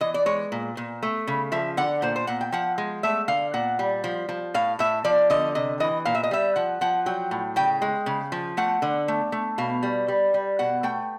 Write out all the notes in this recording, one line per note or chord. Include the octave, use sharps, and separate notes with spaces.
E3 D#5
D5
G#3 C#5
A#2
A#2
A3
C#3
F3 E5
D3 F#5
A#2 C5
C5
A#2 F#5
G5
F3 F#5
G#3
A3 E5
D3 F5
A#2 F#5
G3
F3
F3
A2 F5
A2 E5
F3 D5
D3 D#5
C3 D#5
E3 D#5
A#2 F5
E5
D#5
G3 E5
F3 F#5
F3 F#5
F#3 G5
A2
C#3 G5
G#3
C#3
F3
A3 F#5
D3
A3
A3
B2 F5
G3
G3
G3
B2 F#5
A3 G5